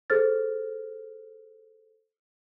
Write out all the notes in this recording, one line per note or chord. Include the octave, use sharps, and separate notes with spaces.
G#4 A4 C5 F6 A6